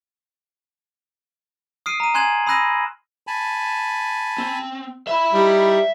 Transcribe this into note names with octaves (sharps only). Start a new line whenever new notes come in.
D#6 F6 C7 D7 D#7
A#5 D#7
G#5 C6 F#6 G#6 E7 F#7
B5 D#6 E6 F#6 A#6 D#7
G#5 A5 B5
C4
E5 B5
G3 D#4 E4